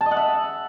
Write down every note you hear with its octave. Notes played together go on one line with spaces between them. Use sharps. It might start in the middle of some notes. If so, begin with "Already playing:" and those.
A5
D#5
F#5
E5